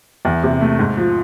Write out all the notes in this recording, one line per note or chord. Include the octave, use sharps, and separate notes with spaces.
E2
C3
A3
G#2
F3